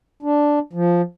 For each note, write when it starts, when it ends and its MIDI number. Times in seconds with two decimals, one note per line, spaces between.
0.23 0.59 62
0.73 1.02 53